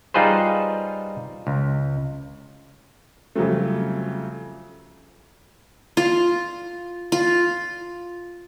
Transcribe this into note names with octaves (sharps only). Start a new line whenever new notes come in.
G3 D#4 F4 G#4 B4 C5
C#2
F2 C#3 F#3 G3 A3
F4
F4